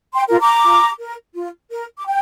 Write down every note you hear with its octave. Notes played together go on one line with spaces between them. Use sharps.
G5 C6
F4 A#4
A#5 D6
F4
A#4
F4
A#4
D6
G5